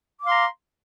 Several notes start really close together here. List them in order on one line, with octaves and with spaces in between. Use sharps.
D6 F5 C6 A#5